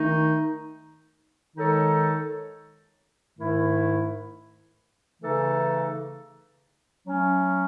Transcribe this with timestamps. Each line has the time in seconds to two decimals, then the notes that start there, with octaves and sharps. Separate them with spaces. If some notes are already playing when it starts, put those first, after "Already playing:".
Already playing: D#3 A3 D#4
1.55 D#3 G#3 D#4 A4 C#5
3.39 G#2 D#3 A3 E4
5.22 C#3 E3 A3 D#4 A4
7.06 F#3 A3 C#4